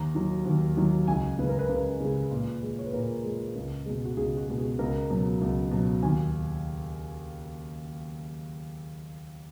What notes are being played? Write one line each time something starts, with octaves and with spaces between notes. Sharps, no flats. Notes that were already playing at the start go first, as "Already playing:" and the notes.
Already playing: D#2 A#5
D#3 F#3
D#2
D#3 F#3
C#2 G#5
C#3 G#3 B4
A#4
B4
C#2 B4
C#3 G#3
A#2
G#3
C#5
B4
A#2 A#4
G#3
C#2
B2 G#3
F#4
C#2 G#4
F#4
B2 G#3
G#4
C#2 A#4
B2 F#3
C#2
B2 F#3
D#2 G#5